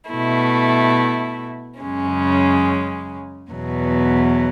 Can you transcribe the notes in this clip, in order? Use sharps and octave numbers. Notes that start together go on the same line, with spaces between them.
B2 A3 E4
F#2 C#3 G#3 C#4
E2 B2 F#3